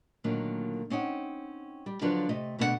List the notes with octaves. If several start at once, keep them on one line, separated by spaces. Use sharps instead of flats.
A#2 D3 D#3 F#3 A3 A#3
C4 C#4 D#4 F#5
G3
D3 F3 F#3 D4 F4 B4
C3 A3 D#5
D2 B2 A3 D4 A4 F#5